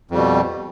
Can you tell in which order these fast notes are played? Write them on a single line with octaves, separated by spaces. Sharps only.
F2 G3 B2